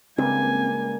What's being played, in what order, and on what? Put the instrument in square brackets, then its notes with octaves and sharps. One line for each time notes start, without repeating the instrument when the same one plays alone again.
[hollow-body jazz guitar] C#2 [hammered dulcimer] G2 A#3 [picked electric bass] C4 [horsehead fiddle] G#5